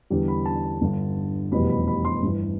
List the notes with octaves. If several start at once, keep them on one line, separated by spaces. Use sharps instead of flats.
E2 D3 G3
B5
A5
G1 G2 D3
F1 E2 B2 G3 B5
B5
B5
C6
G1 G2 E3